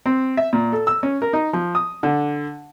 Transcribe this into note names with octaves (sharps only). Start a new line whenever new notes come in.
C4
E5
A#2
A4
E6
C#4
A#4
D#4
F3
D#6
D3